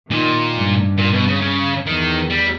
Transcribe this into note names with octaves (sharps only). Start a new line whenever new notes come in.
A#2 D#3
G2
A#2
B2
C#3
C#3
E2 D#3
G3